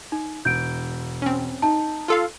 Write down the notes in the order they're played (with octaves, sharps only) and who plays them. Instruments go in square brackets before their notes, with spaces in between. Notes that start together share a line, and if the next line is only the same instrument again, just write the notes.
[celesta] D#4
[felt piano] E1 [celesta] G6 D7
[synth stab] C4 C#4
[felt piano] D#4 [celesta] A5
[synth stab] F4 A4 F5